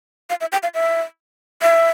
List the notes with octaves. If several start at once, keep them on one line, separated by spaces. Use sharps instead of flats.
F5
E5
G5
F5
E5
E5